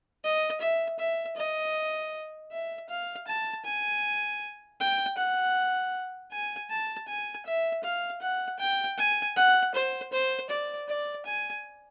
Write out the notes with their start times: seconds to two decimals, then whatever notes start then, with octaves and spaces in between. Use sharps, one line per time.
0.24 D#5
0.61 E5
0.99 E5
1.37 D#5
2.52 E5
2.89 F5
3.28 A5
3.65 G#5
4.80 G5
5.17 F#5
6.31 G#5
6.70 A5
7.08 G#5
7.46 E5
7.84 F5
8.22 F#5
8.59 G5
8.98 G#5
9.37 F#5
9.75 C5
10.13 C5
10.50 D5
10.88 D5
11.26 G#5